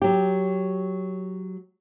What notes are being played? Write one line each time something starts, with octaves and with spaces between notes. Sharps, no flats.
F#3 G4